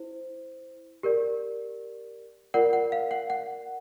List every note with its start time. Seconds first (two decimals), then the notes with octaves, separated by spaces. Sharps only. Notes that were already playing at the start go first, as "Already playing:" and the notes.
Already playing: E4 C5
1.03 G4 A#4 D5
2.54 F4 A#4 D5 F#5
2.73 F#5
2.92 F5
3.11 F#5
3.30 F#5